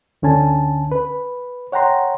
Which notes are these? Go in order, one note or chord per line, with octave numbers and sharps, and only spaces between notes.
D2 D3 C#4 G#5 A5
B4
C#5 F#5 G5 A#5 C6